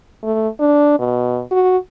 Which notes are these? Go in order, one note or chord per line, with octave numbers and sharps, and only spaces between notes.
A3
D4
B2
F#4